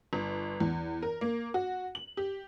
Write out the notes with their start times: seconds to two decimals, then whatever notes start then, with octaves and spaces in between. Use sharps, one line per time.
0.13 G1
0.60 E2
1.02 A#4
1.21 A#3
1.54 F#4
1.95 F#7
2.17 G4